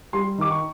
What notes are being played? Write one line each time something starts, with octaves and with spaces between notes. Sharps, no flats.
G3 C6
D#3 D6
C#6